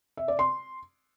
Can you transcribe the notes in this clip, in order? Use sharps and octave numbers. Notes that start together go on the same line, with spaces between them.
E5
D5
C6